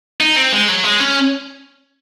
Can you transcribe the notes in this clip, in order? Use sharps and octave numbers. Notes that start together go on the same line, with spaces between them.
D#4
C4
G#3
F#3
G#3
C#4